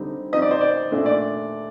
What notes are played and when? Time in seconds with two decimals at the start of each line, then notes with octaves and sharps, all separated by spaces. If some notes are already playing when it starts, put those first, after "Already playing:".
Already playing: D3 G3 C4 D#4
0.33 F3 C4 D#4 D#5
0.42 D5
0.51 C5
0.61 D5
0.91 A#2 A3 D4
1.06 D5